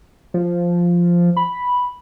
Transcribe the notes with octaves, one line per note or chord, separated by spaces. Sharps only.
F3
B5